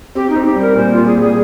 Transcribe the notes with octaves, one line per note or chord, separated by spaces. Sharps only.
C4 G4
D#4
C4
G4
G3
A#4
A#2 C5
A#2 F4
G#4
G3
G#4